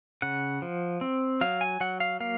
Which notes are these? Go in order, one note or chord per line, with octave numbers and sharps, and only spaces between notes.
C#3 F#5
F3
C4
F#3 F5
G#5
F#3 F#5
F5
A#3 F5